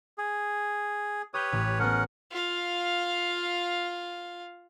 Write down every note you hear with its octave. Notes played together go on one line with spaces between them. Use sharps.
G#4
G4 B4 C#5 D#6 F6 G6
A1
A3 B3 C#4 A#4 F#5
F4 F5